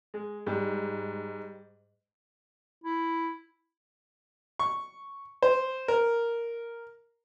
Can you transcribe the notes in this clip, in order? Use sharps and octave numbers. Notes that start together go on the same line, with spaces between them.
G#3
G#2 G3
E4
C#6
C5
A#4